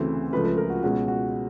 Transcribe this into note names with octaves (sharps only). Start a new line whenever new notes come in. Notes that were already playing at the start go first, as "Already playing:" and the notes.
Already playing: D2 C#3 E3 A3 C4 C5
C#2 C#3 F3 A3 B4
B4
A#4
F#4
C#2 B2 G#3 C#4 F#4
F#4